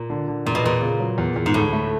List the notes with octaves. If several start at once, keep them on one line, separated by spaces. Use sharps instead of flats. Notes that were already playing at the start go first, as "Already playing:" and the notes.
Already playing: A#2
D3
D3
E2 A#2
B2
E2 A#2
C#3
F#3
E2
E2
G#2
D2 A2
A3